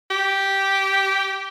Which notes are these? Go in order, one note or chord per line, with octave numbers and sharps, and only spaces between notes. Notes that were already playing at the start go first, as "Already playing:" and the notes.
G4